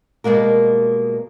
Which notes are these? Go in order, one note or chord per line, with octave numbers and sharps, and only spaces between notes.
B2 G3 G#3 A#3 A#4